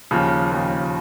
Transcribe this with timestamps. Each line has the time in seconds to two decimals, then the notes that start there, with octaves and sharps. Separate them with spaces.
0.11 D#2 C#3 F3
0.51 D#2 C#3 F3